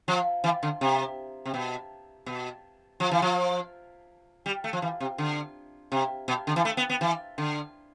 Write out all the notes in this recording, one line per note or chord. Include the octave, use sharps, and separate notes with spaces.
F3
E3
D3
C3
C3
B2
B2
F3
E3
F3
G3
A3
F3
E3
C3
D3
C3
B2
D3
E3
A3
B3
B3
E3
D3